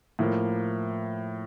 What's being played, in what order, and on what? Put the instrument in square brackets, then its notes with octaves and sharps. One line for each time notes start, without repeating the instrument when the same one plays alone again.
[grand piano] A2 F3 A#3